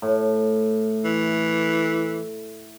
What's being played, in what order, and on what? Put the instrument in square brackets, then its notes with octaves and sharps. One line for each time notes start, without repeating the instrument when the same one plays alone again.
[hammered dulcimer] A2
[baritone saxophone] E3